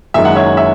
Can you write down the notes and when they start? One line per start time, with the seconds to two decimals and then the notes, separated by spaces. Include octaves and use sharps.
0.14 F#1 F#2 D#3 G#3 E5
0.25 F#5
0.35 C#5 E5
0.57 E5